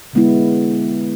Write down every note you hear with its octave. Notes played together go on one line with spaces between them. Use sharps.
D3 G#3 B3 E4